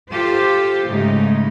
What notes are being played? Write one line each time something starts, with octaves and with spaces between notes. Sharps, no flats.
F4 G4 A4 C5
G#2 C#3 A3 D#4